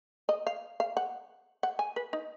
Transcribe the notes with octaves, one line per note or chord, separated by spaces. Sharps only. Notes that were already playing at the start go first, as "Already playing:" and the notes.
D#5
F5
F5
F#5
F#5
G#5
B4
D#4